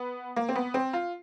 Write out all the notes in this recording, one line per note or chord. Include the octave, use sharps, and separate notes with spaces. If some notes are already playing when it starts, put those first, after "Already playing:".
Already playing: B3
A#3
C4
B3
C4
F4